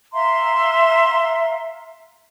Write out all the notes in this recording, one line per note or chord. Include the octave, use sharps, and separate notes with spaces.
E5 F5 A#5 C6